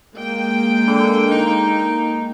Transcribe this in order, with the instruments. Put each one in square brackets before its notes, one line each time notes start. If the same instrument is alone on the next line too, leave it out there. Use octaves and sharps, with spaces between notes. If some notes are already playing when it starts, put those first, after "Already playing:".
[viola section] G#3 A#3 G5
[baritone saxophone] D3
D#4